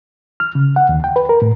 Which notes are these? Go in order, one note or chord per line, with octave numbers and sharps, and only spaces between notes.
F6
C#3
F#5
D#2
G5
B4
A#4
A2